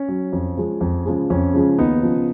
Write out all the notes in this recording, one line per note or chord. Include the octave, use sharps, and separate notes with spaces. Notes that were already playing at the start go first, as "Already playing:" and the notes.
Already playing: C#4
F#3
F2
F3 G#3
F2
C#3 F3 G#3
F2 C#4
C#3 F3 G#3
D#2 B3 D#4
C#3 F3